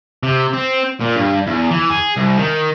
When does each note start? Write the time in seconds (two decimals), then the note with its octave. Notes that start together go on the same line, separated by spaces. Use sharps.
0.23 C3
0.53 C4
1.01 A#2
1.16 G2
1.47 E2
1.71 E3
1.90 G#4
2.17 C2
2.38 D#3